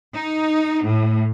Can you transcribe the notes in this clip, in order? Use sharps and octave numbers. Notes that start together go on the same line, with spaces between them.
D#4
A2